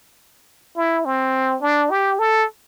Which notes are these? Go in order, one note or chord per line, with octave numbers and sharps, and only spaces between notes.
E4
C4
D4
G4
A4